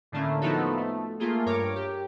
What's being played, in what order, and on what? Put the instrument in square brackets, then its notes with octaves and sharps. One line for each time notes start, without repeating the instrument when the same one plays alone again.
[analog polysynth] A2 D3 A3 A#3 C#4
F3 A3 B3 D#4 F#4 A4
A3
A3 A#3 F4 G#4
G2 A#4 C#5 D6
G4